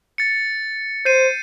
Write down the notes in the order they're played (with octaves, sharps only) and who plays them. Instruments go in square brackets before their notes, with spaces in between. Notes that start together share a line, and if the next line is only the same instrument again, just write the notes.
[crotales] A6 C#7
[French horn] C5 [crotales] G6 C7 D#7